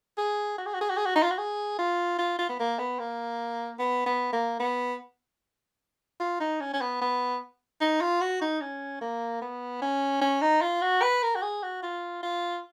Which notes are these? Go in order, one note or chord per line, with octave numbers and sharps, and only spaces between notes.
G#4
F#4
G#4
F#4
G#4
F#4
G#4
F#4
D#4
F4
F#4
G#4
F4
F4
F4
B3
A#3
B3
A#3
B3
B3
A#3
B3
F4
D#4
C#4
C#4
B3
B3
D#4
F4
F#4
D#4
C#4
A#3
B3
C#4
C#4
D#4
F4
F#4
B4
A#4
F#4
G#4
F#4
F4
F4